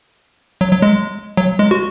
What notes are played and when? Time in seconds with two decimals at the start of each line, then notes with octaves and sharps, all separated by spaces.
0.61 F#3
0.72 F#3
0.82 G#3
1.37 F#3
1.59 G#3
1.71 F#4